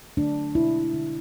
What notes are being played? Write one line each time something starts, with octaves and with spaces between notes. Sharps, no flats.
D3 F#3 A3 D4
B2 G#3 E4
D3 A3